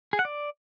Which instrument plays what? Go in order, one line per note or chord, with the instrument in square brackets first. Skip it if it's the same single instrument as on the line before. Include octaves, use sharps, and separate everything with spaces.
[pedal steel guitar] G#4
F#5
D5